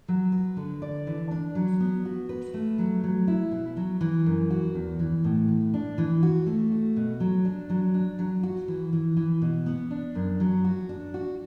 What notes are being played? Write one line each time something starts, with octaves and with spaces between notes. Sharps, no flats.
F#3
B4
D3
D5
E3
D4
F#3
B3
F#4
B4
A3
F#3
F#3
E4
B2
F#3
E3
F#2
F#4
E2
E3
A2
B4
D4
E3
F#4
A3
F#4
B2
F#3
D4
F#3
D4
F#3
F#4
E3
E3
E3
B2
B3
D4
F#2
F#3
F#4
D4
F#4